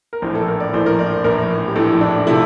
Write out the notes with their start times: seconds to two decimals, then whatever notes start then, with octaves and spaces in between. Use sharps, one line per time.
0.13 A#4
0.22 A#1 A2 E3 C5
0.35 A4
0.48 A#4
0.60 D5
0.74 A#1 A2 E3 C5
0.86 A#4
0.99 D5
1.11 C5
1.24 A#1 A2 E3 A#4
1.68 G4
1.76 A#1 A2 E3 A4
1.92 E4
2.01 D4
2.27 C3 F3 A3 E4